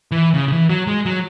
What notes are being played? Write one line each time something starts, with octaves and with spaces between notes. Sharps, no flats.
E3
C#3
C#3
E3
F#3
G#3
F#3